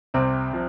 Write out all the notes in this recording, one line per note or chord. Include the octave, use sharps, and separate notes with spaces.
C2 C3 C4
C3 F3